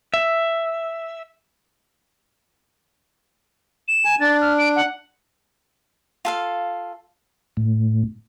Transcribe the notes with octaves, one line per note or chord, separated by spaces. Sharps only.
E5
E7
G#5
D4 A6
F6
D7
F#5
F4 A4 F5
A2